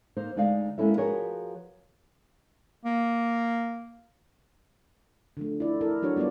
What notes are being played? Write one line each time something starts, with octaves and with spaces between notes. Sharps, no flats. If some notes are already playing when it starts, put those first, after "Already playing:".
A#3 D#4 C5
D2 G#3 D#4 D5 F5
G#3 A#3 C#4 E4 A4 E5
F3 F#4 G#4 A#4 B4 C#5
A#3
D3 F3 A3
E4 D5
E4 A4 A#4
F#3 D4 F#4 C#5
G3 B3 F4 C#5 D5